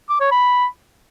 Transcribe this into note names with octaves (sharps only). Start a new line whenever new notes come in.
D6
C#5
B5